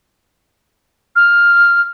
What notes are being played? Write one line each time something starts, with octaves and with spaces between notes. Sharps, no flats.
F6